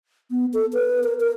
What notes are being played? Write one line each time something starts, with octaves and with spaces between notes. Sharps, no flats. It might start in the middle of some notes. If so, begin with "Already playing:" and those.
B3
A4
B4
A#4
A#4